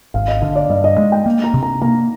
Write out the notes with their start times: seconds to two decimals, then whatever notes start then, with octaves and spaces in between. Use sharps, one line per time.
0.14 G#1 F5
0.28 D#5
0.42 D3 F5
0.56 D5
0.70 G2 D#5
0.84 D#5
0.98 G#3
1.12 G5
1.26 A#3
1.44 A#5
1.54 C3
1.63 A#5
1.82 A#3 A#5